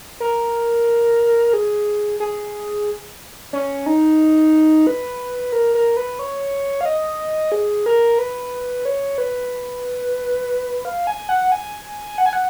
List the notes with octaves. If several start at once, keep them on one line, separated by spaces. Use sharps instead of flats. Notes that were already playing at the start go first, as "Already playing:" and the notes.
A#4
G#4
G#4
C#4
D#4
B4
A#4
A#4
B4
C#5
F5
D#5
G#4
A#4
B4
C#5
B4
F5
G#5
F#5
G#5
F#5
G#5
F#5